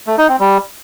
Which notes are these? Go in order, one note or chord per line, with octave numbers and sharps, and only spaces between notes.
A3
D#4
C4
G3